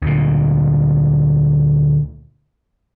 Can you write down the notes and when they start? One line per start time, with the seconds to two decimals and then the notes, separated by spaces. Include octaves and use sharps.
0.02 D2 A#2